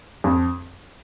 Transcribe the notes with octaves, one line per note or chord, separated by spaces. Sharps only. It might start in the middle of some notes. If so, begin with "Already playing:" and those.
F2